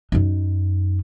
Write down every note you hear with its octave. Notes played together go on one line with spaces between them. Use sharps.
F#2 D#4